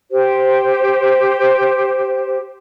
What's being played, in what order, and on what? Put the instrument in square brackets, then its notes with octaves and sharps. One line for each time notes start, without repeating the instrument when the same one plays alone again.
[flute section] G4 C5